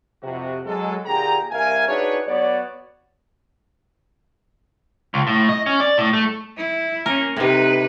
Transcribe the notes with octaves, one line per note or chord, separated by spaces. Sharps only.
F2 C3 F#4
F#3 G#3 A4
A#2 D3 G4 G#4 G5 A#5
C2 A#4 E5 F5 G#5
D4 D#4 F#4 G#4 B4 C#5
F#3 B3 F#4 C#5 D5
C#2
A2
D#5
C#4
D5
A2
A3
E4
A#3 C#4 A#4
A2 C3 D#4 B4